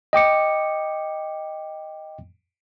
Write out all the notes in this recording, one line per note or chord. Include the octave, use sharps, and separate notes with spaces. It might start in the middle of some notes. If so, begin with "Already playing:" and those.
D#5 G5 D6 C#7